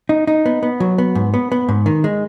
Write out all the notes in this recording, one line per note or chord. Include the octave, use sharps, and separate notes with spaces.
D#4
D#4
B3
B3
F#3
B3
G#2
B3
B3
G#2
D#3
G#3